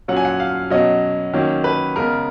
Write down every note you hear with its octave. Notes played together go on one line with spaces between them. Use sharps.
A#2 F#3 C#4 F#5
G#5
F#5
F5
B2 F#3 C#4 D#5
D#3 F#3 A#3 C#4
B4
C#3 G#3 B3 A#4